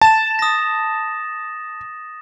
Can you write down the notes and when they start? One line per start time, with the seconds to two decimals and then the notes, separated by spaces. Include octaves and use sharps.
0.02 A5 A6 E7
0.39 D#6 A#6